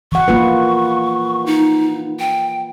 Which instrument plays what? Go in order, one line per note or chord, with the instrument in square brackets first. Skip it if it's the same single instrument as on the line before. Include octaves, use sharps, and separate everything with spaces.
[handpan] E3 F#5 [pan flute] C#6
[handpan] A#3 F4 B4
[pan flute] D#4
G5